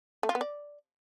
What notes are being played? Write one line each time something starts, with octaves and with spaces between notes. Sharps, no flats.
A3
F4
B3
D5